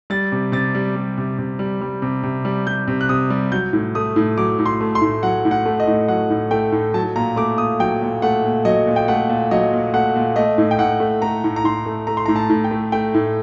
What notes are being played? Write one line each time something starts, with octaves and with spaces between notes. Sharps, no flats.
G3 A6
C3
C3 A6
G3
G3
C3
C3
G3
G3
C3
C3
G3
G3 G6
C3
F#6
C3 D#6
G3
F#3 G6
A2
A3 D#6
A2
F#3 D6
A2
C6
A3
C6
A2
F#3 F#5
A2
F#5
A3
D#5
A2
F#3 F#5
A2
A3 G5
A2
F#3 A5
A#2 A#5
A3 D6
A#2 D#6
F#3 G5
A#2
A3 F#5
A#2
F#3 D#5
A#2
G5
A3 F#5
A#2
F#3 D#5
A#2
A3 F#5
A#2
A3 D#5
A2
G5
A2 F#5
A3
A3 A#5
A2
A#5
A2 C6
A3
A3 A#5
C6
A#5
A2
A5
A2
G5
A3
A3 G5
A2